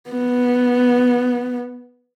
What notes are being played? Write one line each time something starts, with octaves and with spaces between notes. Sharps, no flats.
B3